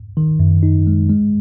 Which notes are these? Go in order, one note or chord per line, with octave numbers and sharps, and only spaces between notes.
D#3
F#2
D#4
G#3
G#3